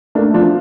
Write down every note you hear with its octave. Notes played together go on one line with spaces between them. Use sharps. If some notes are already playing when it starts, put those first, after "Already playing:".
A3 A#3 D4
F3 D4 F4